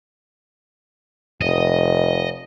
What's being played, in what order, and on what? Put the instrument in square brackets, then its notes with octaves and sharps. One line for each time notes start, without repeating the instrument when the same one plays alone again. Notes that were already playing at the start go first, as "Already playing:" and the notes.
[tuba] F1 [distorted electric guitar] D#5